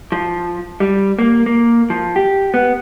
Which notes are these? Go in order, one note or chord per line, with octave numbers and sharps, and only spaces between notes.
F3
G3
A#3
A#3
F3
G4
B3